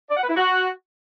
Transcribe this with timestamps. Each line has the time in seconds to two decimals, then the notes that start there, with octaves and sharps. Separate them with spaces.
0.09 D5
0.16 F#5
0.22 B4
0.29 E4
0.35 F#4